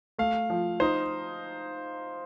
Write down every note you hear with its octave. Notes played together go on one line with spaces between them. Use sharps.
A3 F5
F3
D#4 C5